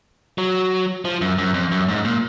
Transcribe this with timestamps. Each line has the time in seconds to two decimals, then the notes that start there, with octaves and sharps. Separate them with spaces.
0.38 F#3
1.05 F3
1.21 F#2
1.38 F#2
1.54 F2
1.72 F#2
1.88 G#2
2.05 A#2